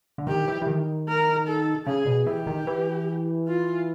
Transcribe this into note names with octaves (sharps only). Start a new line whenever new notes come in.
D3
D#3 G4
E3
E3
D#3
A#4
A4
C#3 G#4
B2
E3 G4
D#3
E3
F4